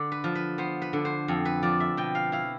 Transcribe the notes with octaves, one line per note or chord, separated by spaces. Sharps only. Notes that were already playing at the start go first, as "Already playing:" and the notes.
Already playing: D3 D5
B4
F3
B4
B3 C5
B4
D3
C5
F2
B4
F3 D5
E5
B2 G5
F5
E4 F5